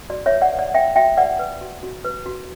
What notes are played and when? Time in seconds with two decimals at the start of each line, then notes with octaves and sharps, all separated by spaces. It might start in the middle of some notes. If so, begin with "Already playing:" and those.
0.10 F#4 D5
0.26 C#5 E5
0.31 B4
0.41 D5 F#5
0.53 B4
0.59 D5 F#5
0.74 B4 E5 G5
0.96 F#4 E5 G5
1.17 B4 D5 F#5
1.39 B4
1.61 F#4
1.83 F#4
2.05 B4
2.26 F#4